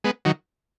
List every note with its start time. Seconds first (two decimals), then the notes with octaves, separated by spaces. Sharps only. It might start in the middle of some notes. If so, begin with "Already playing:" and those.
0.04 G#3 B3
0.25 D#3 F#3